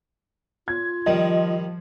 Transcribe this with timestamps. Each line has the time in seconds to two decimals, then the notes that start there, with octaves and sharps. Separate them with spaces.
0.68 F4 G#6
1.06 D#3 F3 G3 D#5